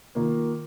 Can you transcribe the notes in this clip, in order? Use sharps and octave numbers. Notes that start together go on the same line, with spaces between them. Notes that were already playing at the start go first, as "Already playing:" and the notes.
D#3 A#3 F4 A#4